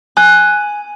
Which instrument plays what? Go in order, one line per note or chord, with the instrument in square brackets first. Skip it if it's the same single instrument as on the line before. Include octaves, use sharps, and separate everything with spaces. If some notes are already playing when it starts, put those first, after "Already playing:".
[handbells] G#5 [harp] F#6